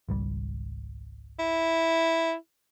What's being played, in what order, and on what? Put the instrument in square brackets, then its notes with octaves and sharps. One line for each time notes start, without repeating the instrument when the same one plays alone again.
[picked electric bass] G#1 C#2 G3
[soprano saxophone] E4